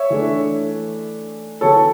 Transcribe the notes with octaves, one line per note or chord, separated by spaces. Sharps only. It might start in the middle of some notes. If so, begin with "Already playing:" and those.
Already playing: C#5 E5
E3 A3 D4
E3 B3 F#4 A4 C#5